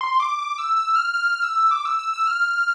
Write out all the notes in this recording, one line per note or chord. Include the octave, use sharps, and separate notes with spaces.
C6
D6
D6
E6
E6
F6
F6
E6
D6
E6
E6
E6
F6